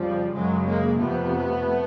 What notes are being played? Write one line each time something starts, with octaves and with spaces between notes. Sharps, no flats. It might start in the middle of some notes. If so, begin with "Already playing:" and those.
Already playing: F2 C#3 F3 G3
F#2 C#3 F#3 G#3
G#3 A#3
F2 C3 A3 B3